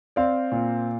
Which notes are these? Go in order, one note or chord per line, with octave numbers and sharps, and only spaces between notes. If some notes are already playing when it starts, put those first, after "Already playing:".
C4 D5 F5
A#2